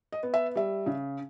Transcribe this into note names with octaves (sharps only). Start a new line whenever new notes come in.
D#5
B3
E5
G3 E5
C#3